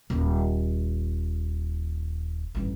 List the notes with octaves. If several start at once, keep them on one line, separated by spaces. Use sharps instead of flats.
D#1
A1 G2